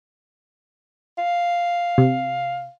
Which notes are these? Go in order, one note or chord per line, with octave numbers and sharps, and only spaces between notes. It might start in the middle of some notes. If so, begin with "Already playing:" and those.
F5
C3